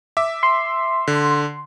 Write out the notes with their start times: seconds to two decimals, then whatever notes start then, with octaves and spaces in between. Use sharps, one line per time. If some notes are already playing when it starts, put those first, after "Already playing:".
0.17 E5 D6
0.43 C6
1.08 D3